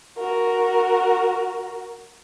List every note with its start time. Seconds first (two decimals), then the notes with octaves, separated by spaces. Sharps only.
0.18 F#4 A#4